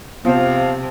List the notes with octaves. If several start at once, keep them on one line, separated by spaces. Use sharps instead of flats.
C3 F3 B3 C4 C5 F5